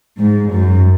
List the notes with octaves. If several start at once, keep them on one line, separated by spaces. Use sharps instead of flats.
G#2
F#2